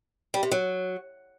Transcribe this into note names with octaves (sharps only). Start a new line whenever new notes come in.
G3
C3
F#3